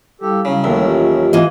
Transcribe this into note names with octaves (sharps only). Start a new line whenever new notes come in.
G3 E4 G4 A4 F5
C#3 F#3 C#4
A1 D#2 A2
F4 G4 D#5
E3 F4 D#5